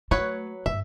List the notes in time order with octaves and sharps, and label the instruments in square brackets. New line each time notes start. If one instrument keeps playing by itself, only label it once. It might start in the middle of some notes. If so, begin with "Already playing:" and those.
[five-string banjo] F#3 B4 C#5 [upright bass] A3
[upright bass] G2 [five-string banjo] E5